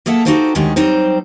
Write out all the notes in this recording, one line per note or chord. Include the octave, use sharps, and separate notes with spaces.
A#3 G#4 A4 E5 F#5 A5
D#4 F#4 G4 A4 C5 F5
D2 D3 D#3 G#3 G4 C#5
F#3 G3 C4 D#4 C5